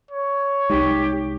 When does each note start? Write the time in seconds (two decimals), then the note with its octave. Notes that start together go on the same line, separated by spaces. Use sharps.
0.11 C#5
0.70 C2 G#3 D#4 G4